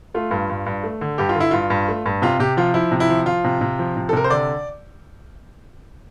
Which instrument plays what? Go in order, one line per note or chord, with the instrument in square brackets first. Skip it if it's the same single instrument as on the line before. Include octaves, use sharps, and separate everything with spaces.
[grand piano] A3 F4
G2
G2
G2
A3
D3
G2 G4
F4
D3
E4
G2 F4
G2
A3
G2
C3 F4
C3 G4
F3 F4
F3 E4
C3
E4
F3
F3 F4
C3
C3
F3
C3
A4
C3 A#4
C5
D3 D5